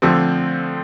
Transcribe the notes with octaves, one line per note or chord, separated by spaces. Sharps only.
D3 F3 A3 C4